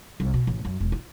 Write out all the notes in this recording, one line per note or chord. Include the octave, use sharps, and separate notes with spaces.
C2
B2
A1
F#2
E1
F4